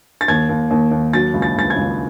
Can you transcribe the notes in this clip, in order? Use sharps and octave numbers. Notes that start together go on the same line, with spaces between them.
A6
D#2 G#6
D#2
D#2
D#2
F#3 A6
C#2
A6
C#2 A6
G#6
C#2